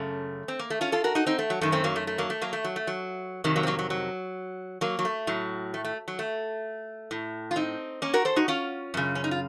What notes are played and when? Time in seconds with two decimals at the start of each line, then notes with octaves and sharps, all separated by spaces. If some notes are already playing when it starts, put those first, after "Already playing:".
Already playing: F#2 C#3 A3
0.48 C4
0.59 A#3
0.70 A3
0.81 C#4 F4
0.92 F4 A4
1.04 F#4 A#4
1.15 D#4 F#4
1.26 C4 D#4
1.39 A3
1.50 F#3
1.61 F#2 D#3 A3
1.72 A3 C4
1.84 F#3 A#3
1.96 A3
2.07 A3
2.18 F#3 A#3
2.30 A3
2.42 F#3 A#3
2.53 A3
2.64 F#3
2.76 A3
2.87 F#3
3.44 F2 C3 D#3 F#3
3.56 F#3 A#3
3.63 C4
3.67 F#3 A#3
3.79 F#3
3.90 F#3
4.81 F#3 A#3
4.99 F#3
5.05 A3
5.27 A2 F#3
5.74 A3
5.85 A3
6.08 F#3
6.19 A3
7.11 A2
7.51 F4
7.56 C4 D#4
8.02 A#3 C#4
8.14 F#4 A#4
8.25 A4 C5
8.36 D#4 F#4
8.48 C#4 F4
8.94 F#2 C#3
9.15 C#4
9.24 D#4
9.31 F4